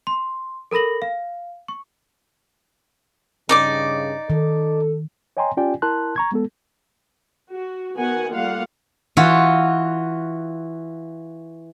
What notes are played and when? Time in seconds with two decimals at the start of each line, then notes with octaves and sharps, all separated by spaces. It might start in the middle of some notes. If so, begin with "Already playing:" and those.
0.07 C6
0.71 A4 A#4 B5 A#6 F#7
1.02 F5
1.68 C#6
3.49 G2 C#3 D#4 D5 D6
4.30 D#3 A4
5.37 C#5 D#5 G5 G#5 A#5 C6
5.57 C#4 F4 G4 D5 G5 G#5
5.82 E4 A#4 A5 C6 F#6
6.16 A#5 C#6 G#6
6.32 G#3 B3 A4
7.52 F#4
7.97 D#3 B3 F#4 A#4 F#5 G#5
8.34 G3 A3 A#3 F4 F5 F#5
9.17 E3 F4 F#4